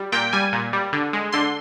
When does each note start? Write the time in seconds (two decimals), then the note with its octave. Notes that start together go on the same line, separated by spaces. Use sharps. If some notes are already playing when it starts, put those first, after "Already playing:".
Already playing: G3
0.12 A#2 G5
0.33 G3 G#5
0.52 A#2
0.73 G3
0.93 D3
1.13 G#3
1.32 D3 C6